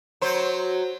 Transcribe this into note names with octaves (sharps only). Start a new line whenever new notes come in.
F#3 C5